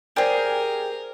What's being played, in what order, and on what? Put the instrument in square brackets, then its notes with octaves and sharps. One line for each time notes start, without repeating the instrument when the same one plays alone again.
[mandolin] G4 G#4 [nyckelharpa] A#4 [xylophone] C5 D5 G#5